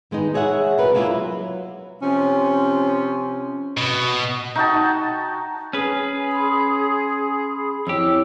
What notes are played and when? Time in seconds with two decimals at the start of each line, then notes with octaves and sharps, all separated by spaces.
0.11 D#3 G#3 B3 D#4
0.34 G#4 C#5 E5 F#5
0.78 B2 G3 B3 A#4 B4
0.94 G#3 A#3 C#4 E4 F4
1.06 F#3
2.02 C3 F3 C#4
3.77 B2
4.56 D#4 F#4 G5 A5
5.73 C#4 G#4 B4
6.31 B5 C6
7.87 F2 E4 G4 C#5 E6